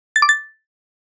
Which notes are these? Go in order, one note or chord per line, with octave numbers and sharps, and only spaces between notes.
A6
D6
A6